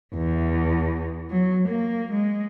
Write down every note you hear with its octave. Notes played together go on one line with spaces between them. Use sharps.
E2
F#3
A#3
G#3